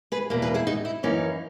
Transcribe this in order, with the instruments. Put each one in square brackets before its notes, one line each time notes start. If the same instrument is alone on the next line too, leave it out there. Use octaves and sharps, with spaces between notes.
[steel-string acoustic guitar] G#4 B4
E2 B2 A#3
G#4 B4
E4 G#4
D#4 F#4
E4
F#2 E3 A#3 C#4 D#4